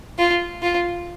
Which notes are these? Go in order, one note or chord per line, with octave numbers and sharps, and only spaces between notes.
F4
F4